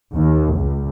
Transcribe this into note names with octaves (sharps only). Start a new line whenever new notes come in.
D#2
C#2